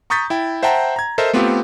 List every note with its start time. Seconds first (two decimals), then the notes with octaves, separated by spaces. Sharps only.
0.10 A#5 C#6 D#6 G6 A6 B6
0.30 E4 G5
0.63 C5 E5 F#5 G5 A5 A#5
0.96 A#5 G#6
1.18 A4 A#4 C5 D#5 E5
1.33 A3 B3 C4 F4 G4